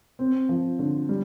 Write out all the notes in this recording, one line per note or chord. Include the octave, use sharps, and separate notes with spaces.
C4
F3
D3
G3